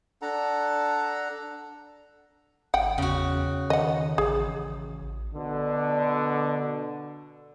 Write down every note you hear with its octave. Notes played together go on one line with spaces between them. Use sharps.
D4 A4 F#5 A#5
G#1 F#5 G5
E2 C#3 F#4
D#3 D#5 F#5
A1 G#4
B2 D3